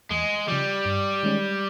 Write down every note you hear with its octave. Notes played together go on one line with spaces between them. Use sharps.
E2 G#3
C#3 F3 G3
G2
D#3 G#3 C#4